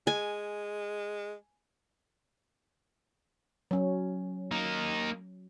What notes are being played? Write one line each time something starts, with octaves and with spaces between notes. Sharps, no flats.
G#3 G#5
F#3 C#4
A#3 D#4